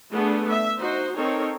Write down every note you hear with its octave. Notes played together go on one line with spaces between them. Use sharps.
A3 B3 D4 G#4
E5
D#4 F#4 C5
C4 D#4 A4 A#4 C#5